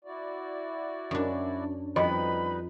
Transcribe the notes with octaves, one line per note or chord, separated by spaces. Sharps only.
E4 F#4 D5
F#2 D4
F2 G3 D#4 F#4 B4 D#5 B5 C6